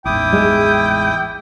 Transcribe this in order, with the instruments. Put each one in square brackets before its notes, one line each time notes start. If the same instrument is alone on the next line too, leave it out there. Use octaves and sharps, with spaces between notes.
[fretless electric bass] A1 E2 G#2 [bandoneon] E4 D6 D#6 [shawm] G5
[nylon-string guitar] G#3